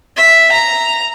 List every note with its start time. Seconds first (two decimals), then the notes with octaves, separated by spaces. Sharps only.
0.16 E5
0.52 A#5